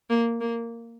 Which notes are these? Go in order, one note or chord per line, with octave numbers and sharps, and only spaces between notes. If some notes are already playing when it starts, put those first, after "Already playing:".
A#3
A#3